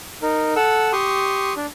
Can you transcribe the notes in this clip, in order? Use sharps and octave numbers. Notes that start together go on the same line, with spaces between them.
D#4 A#4
A4 F#5 E6
G4 C6 C#6 D#6
D4